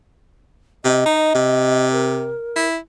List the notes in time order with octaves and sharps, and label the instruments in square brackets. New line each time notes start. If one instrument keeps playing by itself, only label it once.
[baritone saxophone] C3 [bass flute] D#5
[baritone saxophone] D#4
C3
[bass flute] A#4
[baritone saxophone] E4